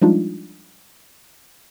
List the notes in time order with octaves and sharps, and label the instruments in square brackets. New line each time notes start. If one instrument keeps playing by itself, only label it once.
[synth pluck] F3 G3 G#3 D4 D#4 F4